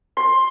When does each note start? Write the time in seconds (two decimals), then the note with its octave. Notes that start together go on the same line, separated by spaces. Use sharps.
0.17 C6